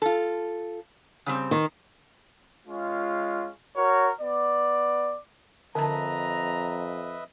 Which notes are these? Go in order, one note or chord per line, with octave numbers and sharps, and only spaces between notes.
F4 A4
C#3 G3 C4
D#3
G#3 C#4 F4
F#4 A#4 C#5
B3 D5
F2 D3 B4 D#5 E5 A5 A#5